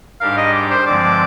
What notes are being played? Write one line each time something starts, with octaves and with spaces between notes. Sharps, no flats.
G#2 G3 D4 G4 A#4 F5
D#5
D5
C5
G2 D3 F3 G#3 C4 D5